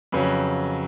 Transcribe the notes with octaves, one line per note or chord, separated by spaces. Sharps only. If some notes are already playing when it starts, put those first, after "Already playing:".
F2 C#3 F#3 B4